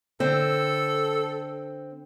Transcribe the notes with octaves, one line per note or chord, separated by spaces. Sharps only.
D3 C4 A4